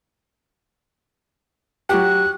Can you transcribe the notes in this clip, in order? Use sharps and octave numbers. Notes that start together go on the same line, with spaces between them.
F#3 F#4 G4 F#6